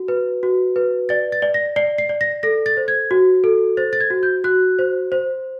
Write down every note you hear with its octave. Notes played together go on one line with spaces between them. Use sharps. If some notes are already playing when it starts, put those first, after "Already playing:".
Already playing: F#4
B4
F#4
B4
D5 A6
A6
D5
A#6
D5 C7
C7
D5
A#6
A4 A#6
A6
C5
G#6
F#4
A4
C5 A6
A6
G#6
F#4
G6
F#4 F#6
C5
C5